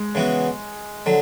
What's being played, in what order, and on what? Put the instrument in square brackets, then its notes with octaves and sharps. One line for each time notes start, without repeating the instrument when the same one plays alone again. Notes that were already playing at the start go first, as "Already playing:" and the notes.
Already playing: [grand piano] G#3
[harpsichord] C#3 E3 B3 F#4
D3 F#3